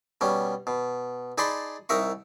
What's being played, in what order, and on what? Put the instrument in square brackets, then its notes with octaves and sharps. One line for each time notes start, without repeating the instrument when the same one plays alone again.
[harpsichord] B2 G3 C#4
B2
D#4 G#4 D5 A5 B5 C6
C2 D#4 A#4 E5 C#6